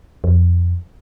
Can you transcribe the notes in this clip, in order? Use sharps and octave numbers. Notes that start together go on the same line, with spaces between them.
F2